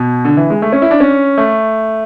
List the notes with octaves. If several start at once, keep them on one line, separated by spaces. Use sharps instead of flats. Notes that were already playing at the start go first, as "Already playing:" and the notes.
Already playing: B2
D3
E3
G#3
A3
C#4
E4
D4
C#4
A3